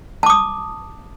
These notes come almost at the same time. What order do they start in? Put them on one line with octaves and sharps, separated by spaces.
A5 D6 D#6